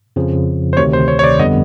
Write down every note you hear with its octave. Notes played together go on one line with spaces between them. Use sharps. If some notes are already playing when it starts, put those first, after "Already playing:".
F2 C#3 F3
C5
D2 C3 D#3 C#5
C5
C#5
C#5
D5
G1 F2 D3 G3 B3 D#5